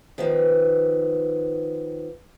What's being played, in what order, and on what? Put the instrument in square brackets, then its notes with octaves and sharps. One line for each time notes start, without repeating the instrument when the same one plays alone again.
[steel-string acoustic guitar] D#3 F3 B3